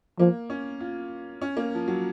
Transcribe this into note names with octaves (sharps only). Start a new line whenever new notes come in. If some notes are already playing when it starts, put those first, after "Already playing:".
F3 A#3
C#4
F4
C#4
A#3
F3
F#3